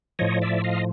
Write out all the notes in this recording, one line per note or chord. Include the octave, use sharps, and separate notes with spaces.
A2 F3 C#5 D#5
D5 E5
D#5 F5